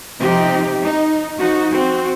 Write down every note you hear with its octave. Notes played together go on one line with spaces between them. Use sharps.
C3 F3 C4 D#4 G4
D#4
F3 D#4 F#4
C4 F#4